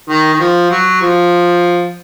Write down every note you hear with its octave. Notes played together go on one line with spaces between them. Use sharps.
D#3
D#3
F3
F#3
F3